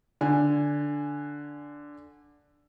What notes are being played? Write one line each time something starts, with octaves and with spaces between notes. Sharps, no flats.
D3 G#5